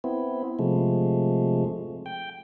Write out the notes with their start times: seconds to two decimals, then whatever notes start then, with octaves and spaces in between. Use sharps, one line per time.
0.04 B3 C4 E4
0.59 C3 F3 G#3 A3
2.06 G5